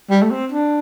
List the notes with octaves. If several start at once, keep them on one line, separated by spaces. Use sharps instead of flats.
G3
A3
C4
D4